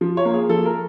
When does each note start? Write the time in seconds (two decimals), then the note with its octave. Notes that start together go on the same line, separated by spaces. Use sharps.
0.01 F3
0.17 C#5
0.25 A#3
0.34 G#4
0.49 F3 A4
0.66 A#4